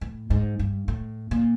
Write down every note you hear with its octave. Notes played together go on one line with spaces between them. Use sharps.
A2
G#2
G2
A2
A#2